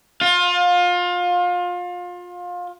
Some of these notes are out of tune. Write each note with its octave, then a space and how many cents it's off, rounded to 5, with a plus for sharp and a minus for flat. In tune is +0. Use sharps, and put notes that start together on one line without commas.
F4 +25